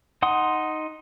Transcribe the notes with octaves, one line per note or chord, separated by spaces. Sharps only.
D#4 F#5 C6 D#6